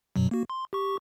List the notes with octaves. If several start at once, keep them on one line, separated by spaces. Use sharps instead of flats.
F#2 B2 F#3
A#3 F#4
C6
G4 C#6